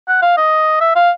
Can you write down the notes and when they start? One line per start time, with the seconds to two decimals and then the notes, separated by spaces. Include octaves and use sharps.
0.08 F#5
0.22 F5
0.37 D#5
0.81 E5
0.95 F5